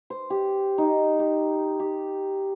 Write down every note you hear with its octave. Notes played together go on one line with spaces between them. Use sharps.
C5
G4
D#4
G4
G4